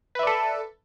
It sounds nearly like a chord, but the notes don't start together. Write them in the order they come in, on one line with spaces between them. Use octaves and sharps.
B4 E5 D5 A4